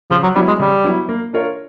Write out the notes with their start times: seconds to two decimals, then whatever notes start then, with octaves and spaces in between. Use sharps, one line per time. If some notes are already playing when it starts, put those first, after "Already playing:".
0.11 C#3 F3
0.23 F#3
0.35 F#3 G3 B3 E4
0.47 G#3
0.59 C#3 G3
0.84 F#3 B3 E4
1.09 A#3
1.33 D4 F4 A#4 C#5